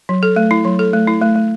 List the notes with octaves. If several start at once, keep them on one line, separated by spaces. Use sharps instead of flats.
F#3
A4
A3
E4
F#3
A4
A3
E4
A3
A3